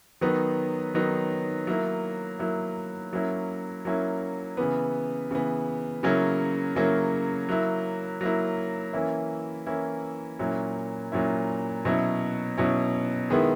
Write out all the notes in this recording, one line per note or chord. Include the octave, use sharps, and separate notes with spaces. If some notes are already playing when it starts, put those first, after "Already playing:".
D#3 F#3 B3 D#4
D#3 F#3 B3 D#4
F#3 A#3 E4
F#3 A#3 E4
F#3 A#3 C#4 E4
F#3 A#3 C#4 E4
C#3 E3 B3
C#3 E3 B3
C#3 F#3 A#3 C#4 E4
C#3 F#3 A#3 C#4 E4
F#3 A#3 E4
F#3 A#3 E4
E3 A#3 C#4 E4
E3 A#3 C#4 E4
A#2 F#3 C#4 E4
A#2 F#3 C#4 E4
B2 F#3 C#4 E4
B2 F#3 C#4 E4
D#3 G#3 B3 E4